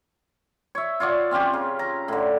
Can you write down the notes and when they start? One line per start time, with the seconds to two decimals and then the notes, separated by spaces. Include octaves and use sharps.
0.75 C#5 E5
1.00 F4 C#5 D5 F#5
1.31 C4 C#4 F4 G4
1.53 C#3
1.79 A#5
2.08 A2 D3